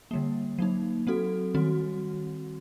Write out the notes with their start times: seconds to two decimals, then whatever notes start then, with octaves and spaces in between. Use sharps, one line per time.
0.11 D3 G3 A#3
0.58 F#3 A#3 D#4
1.07 F#3 C4 F#4 A4
1.54 D#3 G3 C4 F#4